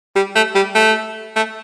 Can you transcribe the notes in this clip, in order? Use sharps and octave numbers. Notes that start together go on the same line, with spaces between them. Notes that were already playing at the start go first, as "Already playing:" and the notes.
G3
A3
G3
A3
A3